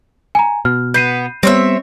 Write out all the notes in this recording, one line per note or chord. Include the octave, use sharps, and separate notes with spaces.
G#5 A#5
B2 F6
B3 G6 C7 D#7
G3 B3 C4 C#5 E5